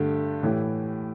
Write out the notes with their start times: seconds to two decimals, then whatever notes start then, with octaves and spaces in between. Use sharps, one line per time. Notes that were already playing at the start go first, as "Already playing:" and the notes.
Already playing: G2 D3 A3 G4
0.43 A2 E3 A3 G4